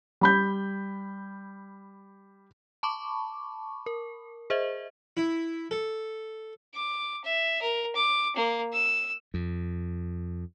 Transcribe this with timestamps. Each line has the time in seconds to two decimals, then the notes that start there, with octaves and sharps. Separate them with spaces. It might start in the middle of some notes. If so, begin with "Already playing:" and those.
0.21 G3 B5 G6
2.83 A5 B5 C#6 D6
3.86 A#4
4.50 G#4 C5 D#5 E5
5.17 E4
5.71 A4
6.74 D6
7.24 E5
7.61 A#4
7.95 D6
8.36 A#3
8.73 E6
9.34 F2